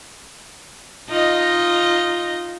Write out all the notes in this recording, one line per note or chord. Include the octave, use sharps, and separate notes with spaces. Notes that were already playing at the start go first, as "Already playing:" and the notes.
D#4 F4 D#5